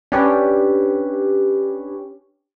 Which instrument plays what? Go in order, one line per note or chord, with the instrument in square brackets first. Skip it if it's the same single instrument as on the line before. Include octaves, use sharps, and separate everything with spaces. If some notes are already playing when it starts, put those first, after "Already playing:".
[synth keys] C#4 D4 G4 B4 C#5